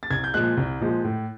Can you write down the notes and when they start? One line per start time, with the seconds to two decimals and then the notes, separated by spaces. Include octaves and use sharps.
0.03 A6
0.10 C2 G#6
0.24 G6
0.34 A#2 F3 G#3 F#6
0.57 C2
0.80 A#2 F3 G#3
1.05 A2